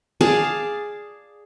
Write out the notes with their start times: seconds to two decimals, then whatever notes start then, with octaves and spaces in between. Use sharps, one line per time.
0.21 G#4 D5 F5 A5